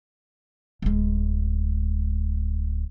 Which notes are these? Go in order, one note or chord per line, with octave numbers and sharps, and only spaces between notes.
D1 G#3